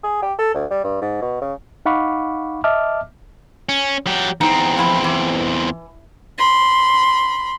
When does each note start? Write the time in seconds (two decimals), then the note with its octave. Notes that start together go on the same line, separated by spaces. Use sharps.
0.04 G#4
0.22 G4
0.39 A4
0.54 D2
0.70 G3
0.84 G2
1.01 G#2
1.22 B2
1.42 C#3
1.86 D#4 F5 F#5 B5 C#6 D6
2.64 D#5 E5 A5 D6 F6
3.69 C#4
4.06 F#3 G4
4.41 E2 C4 D#4
4.78 F3 E4 A5
5.04 E3
6.38 B5 C6